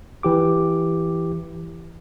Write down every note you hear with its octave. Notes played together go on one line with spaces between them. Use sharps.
E3 G4 D6